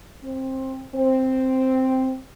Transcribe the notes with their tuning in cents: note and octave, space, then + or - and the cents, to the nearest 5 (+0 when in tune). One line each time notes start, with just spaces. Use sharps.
C4 +15
C4 +0